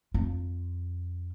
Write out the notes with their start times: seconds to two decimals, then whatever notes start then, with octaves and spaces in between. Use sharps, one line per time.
0.14 F2 F4